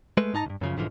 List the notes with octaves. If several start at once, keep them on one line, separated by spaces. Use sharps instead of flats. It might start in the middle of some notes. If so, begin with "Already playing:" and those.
G#3 A3 B4
G#2 D#4 A5 A#5
C#2 G2
F#2 C#3 F3
B1 G#2 D3 E3 F3